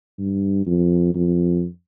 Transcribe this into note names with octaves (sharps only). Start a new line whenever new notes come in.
G2
F2
F2